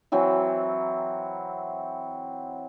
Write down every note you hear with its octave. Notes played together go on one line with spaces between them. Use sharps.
E3 F#3 C4 E4